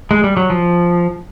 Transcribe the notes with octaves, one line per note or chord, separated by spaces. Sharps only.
G#3
G3
F#3
F3